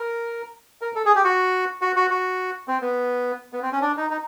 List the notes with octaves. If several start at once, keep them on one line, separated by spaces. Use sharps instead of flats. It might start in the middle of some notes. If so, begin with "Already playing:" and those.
Already playing: A#4
A#4
A4
G#4
G4
F#4
F#4
F#4
F#4
C4
B3
B3
C4
C#4
D4
D#4
D#4